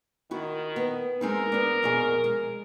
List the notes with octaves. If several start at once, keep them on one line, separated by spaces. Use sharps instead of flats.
D#3 E4 F#4
B3
G#3 C4 D#4 A#4
B3 D4
F2 B2 G#4
G#3